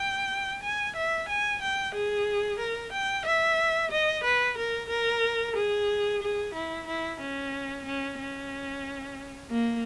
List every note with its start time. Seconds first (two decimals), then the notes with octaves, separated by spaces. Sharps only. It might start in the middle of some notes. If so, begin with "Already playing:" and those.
Already playing: G5
0.63 G#5
0.96 E5
1.29 G#5
1.62 G5
1.95 G#4
2.59 A#4
2.92 G5
3.26 E5
3.91 D#5
4.24 B4
4.58 A#4
4.90 A#4
5.56 G#4
6.22 G#4
6.54 E4
6.87 E4
7.21 C#4
7.86 C#4
8.19 C#4
9.51 A#3